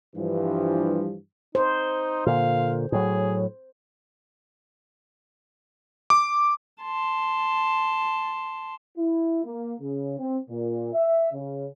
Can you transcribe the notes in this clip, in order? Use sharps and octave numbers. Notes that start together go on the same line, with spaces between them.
G2 E3 F3
D#4 C5
A#2 D3 F5
A2 F#3 G#4
D6
A5 C6
E4
A#3
C#3
C4
A#2
E5
C#3